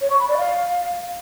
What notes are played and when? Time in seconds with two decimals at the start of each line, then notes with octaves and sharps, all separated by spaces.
0.01 C#5
0.10 C#6
0.20 B5
0.29 D5
0.38 F5